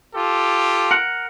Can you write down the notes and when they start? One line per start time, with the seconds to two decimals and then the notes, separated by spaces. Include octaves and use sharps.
0.15 F4 G4 A4
0.91 A#4 F#5